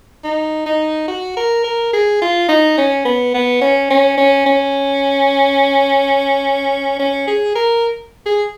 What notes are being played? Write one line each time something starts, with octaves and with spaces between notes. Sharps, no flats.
D#4
D#4
F#4
A#4
A#4
G#4
F4
D#4
C#4
B3
B3
C#4
C#4
C#4
C#4
C#4
G#4
A#4
G#4